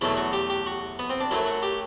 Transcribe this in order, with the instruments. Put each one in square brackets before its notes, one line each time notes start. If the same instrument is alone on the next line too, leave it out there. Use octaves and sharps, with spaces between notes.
[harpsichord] E2 B2 F#3 A3 E4
F#4
G4
G4
F#4
B3
C4
D4
F#2 F#3 A3 E4
F#4
G4